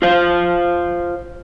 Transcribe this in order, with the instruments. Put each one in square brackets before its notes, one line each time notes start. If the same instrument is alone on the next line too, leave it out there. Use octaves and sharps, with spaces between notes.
[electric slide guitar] F4 C5 F5